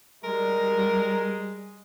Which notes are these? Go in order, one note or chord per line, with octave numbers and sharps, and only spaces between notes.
G3 G#3 A#4